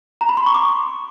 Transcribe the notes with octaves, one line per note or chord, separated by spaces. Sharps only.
A#5
B5
C6
C#6
D6